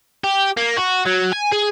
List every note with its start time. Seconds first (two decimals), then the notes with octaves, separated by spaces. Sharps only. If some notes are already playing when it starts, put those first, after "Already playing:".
0.24 G4
0.57 A#3
0.77 F#4
1.05 F#3
1.32 G#5
1.52 G#4